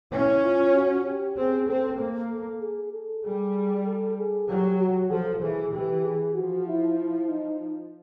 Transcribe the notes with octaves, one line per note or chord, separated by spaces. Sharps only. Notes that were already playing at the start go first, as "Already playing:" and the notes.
C#4 E4
F4
F#4
G4
C4 G#4
C4 A4
A#3
A4
G#4
A4
G3 G#4
A4
G#4
F#3 G4
F#4
F3 A4
E3 G#4
E3 G4
G#4
F3 F#4
E4
E4
D#4